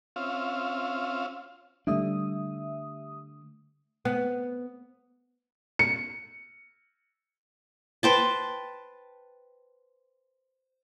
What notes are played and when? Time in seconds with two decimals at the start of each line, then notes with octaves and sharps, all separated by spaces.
0.16 C4 C#4 F4 E5 F5
1.87 D3 G3 A3 D4 E5 D#6
4.05 B3
5.79 C#7
8.03 B4 C5 G5 A5